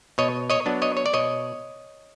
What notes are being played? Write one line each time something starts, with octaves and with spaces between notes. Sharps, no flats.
B2 C#5 D#5
C#5 D#5
F#3 B3 D4
C#5 D#5
C#5
D5
B2 C#5 D#5